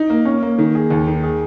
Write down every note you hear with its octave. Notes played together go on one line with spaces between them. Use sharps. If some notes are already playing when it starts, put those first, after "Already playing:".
Already playing: D#4
A#3
C#4
A#3
D#3
G#4
D#2
D#3
G#4